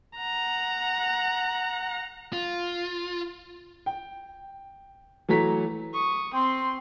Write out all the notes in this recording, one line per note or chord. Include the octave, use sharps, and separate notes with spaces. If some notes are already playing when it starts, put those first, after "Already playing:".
F#5 A#5
F4
G5
E3 F#3 A3 A#5 B6
C#6 D#6
C4 G5 C6